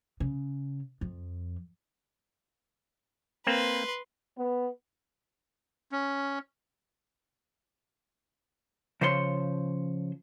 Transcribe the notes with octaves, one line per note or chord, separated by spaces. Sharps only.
C#3
F2
A#3 C4 B4 C6
B3
C#4
C#3 F3 C5 C#5 C6